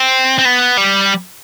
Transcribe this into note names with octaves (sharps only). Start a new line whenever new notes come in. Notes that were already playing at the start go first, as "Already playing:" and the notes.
Already playing: C4
C4
B3
G3